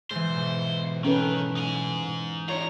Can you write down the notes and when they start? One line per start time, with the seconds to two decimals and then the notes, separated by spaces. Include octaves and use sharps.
0.11 G#2 E3 C5
0.29 B1
1.05 D#3 C#4 A4 B4
1.56 D#4 G#5
2.49 D4 F4 C#5 A#5